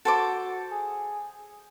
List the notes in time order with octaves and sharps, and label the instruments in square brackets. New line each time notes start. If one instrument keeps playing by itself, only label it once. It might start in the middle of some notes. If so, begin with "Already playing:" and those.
[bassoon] F#4 [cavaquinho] A4 C5 D6
[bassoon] G#4